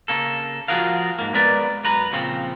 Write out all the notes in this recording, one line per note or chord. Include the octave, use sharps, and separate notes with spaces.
C#3 A#3 A4
F3 F4 F#4 G#4 A#4 F5
G#2 A#3
G#3 B3 A#4 B4 D5
F#2 B4 A#5
A#2 C#3 F3 C4